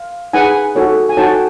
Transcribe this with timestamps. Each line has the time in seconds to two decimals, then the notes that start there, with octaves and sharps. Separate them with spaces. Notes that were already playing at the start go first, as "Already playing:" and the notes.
Already playing: F5
0.33 D#4 G#4 B4 F#5 G#5
0.75 D#4 F#4 A4 C#5
1.09 G#5
1.17 D#4 F#4 A4 C#5 G5 A5